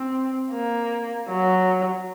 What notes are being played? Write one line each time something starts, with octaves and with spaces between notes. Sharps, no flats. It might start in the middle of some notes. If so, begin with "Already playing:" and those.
Already playing: C4
A#3
F#3